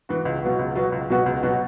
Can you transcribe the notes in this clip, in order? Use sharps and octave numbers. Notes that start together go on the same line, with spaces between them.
E3 B3 F#4
C#2
B2 F#3 B3 F#4
C#2
B2 F#3 B3 F#4
C#2
B2 F#3 B3 F#4
C#2
B2 F#3 B3 F#4